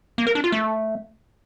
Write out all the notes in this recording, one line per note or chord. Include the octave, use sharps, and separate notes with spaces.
A#3
A#4
D4
F4
A3